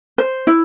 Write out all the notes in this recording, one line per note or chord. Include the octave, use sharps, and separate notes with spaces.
C5
E4